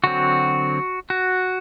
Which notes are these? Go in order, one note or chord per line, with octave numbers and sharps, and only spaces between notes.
D3 F#3 C4 F#4
F#4